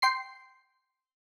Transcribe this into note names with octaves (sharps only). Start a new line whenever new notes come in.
G5 C6 C7